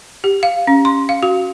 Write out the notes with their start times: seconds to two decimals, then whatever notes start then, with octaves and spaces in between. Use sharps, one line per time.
0.24 G4
0.43 F5
0.67 C#4
0.85 C6
1.09 F5
1.23 F#4